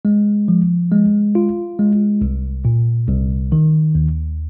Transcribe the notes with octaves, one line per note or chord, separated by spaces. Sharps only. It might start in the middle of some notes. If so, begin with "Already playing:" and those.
G#3
F3
G#3
F4
G#3
C2
A#2
C2
D#3
D#2